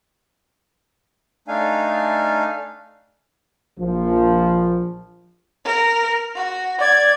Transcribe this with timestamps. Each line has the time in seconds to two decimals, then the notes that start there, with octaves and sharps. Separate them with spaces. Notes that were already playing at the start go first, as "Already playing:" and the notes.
1.48 A3 D4 D#4 F5 G#5
3.80 A#1 F3
5.64 A#4
6.34 F#4
6.81 D5 G#6